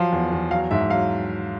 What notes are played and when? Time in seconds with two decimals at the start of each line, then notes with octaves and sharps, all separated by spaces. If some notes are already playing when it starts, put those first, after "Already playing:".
Already playing: F3 F#3 F5
0.12 E2
0.32 E2
0.51 F#3 F5
0.71 G#2 E5
0.90 F#3 F5